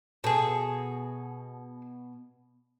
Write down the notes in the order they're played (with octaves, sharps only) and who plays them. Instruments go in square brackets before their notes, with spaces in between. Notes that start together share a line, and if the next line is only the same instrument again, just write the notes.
[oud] B2 [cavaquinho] G#4 A4